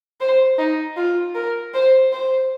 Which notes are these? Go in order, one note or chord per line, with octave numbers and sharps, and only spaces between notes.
C5
D#4
F4
A#4
C5
C5